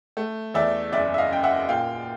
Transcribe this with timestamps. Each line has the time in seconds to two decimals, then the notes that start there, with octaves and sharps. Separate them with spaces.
0.17 A3
0.54 E2 D5 E5
0.92 F#1 D5 E5
1.14 E5
1.18 D#5 F5
1.30 F#2 G5
1.43 E5 F#5
1.68 A#2 F5 G5